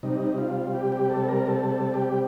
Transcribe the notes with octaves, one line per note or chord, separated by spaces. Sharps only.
C3 G3 D#4
F4
G4
G4
A4
A#4
A4
A4
G4